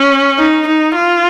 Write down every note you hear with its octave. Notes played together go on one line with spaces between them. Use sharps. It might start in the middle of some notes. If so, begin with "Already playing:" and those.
Already playing: C#4
D#4
D#4
F4